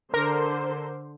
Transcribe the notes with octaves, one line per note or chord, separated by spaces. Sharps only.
D3 A#4 C5